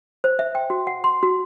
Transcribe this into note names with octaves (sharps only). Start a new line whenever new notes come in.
C5
E5
G5
F#4
F#5
C6
F#4